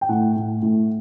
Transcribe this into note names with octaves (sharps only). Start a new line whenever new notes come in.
G5
A2 F#5
A2
A2